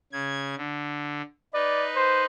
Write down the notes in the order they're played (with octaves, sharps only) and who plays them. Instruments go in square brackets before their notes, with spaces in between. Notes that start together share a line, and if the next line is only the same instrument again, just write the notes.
[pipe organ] C#3 G#6
D3
[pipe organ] D#4 B4 [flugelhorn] D5
[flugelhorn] C5